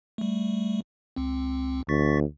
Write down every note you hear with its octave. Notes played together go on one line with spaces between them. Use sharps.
G3 A3
C#2 C4
D2 C#6 A6 B6